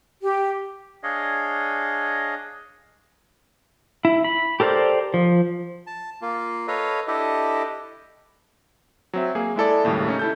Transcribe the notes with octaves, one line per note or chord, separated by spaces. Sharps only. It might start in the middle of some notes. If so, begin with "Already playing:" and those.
G4
D4 G#4 C#5 D#5 F5
E4
B5
G4 A4 A#4 C5 D5
F3
A5
A#3 F4
A4 B4 C#5 D#5 F5
D4 E4 G4 A4 D#5
F#3 C4 E5
A#3 G#4
G#3 E4 A4 D5
A#1 D#2 A2 C#3 G3
A3 C#4 D#4
E4 A4 G6